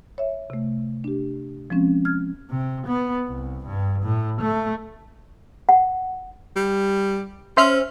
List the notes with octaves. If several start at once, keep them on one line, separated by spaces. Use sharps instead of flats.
C#5 E5
C3 A3
D4 G4
F3 G#3 C4 C#4
F6 G#6
C3
B3
C2
G2
A2
A3
F#5
G3
C#4 C5 E5 F6